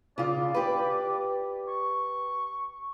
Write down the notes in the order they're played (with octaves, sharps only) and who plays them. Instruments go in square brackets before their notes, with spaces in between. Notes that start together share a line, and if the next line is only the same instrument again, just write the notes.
[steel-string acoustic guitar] C#3 F4 [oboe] D5
[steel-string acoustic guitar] G4 B4
[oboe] C#6